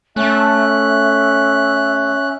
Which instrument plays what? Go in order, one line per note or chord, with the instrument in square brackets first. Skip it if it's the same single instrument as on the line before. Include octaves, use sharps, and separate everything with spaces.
[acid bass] A3 [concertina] C#4 F#6 [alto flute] E5